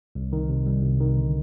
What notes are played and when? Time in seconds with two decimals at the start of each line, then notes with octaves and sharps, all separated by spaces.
0.15 C2
0.33 D#3
0.49 C3
0.66 G3
0.83 C2
1.00 D#3
1.17 D3